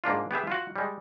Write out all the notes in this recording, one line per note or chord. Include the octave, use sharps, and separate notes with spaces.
G#2 A#3 D4 F4
B3 G4 G#4 E5
F4 F#4
G3 G#3